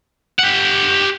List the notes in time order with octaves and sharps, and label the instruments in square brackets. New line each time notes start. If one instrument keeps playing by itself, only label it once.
[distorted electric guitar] G4 F#5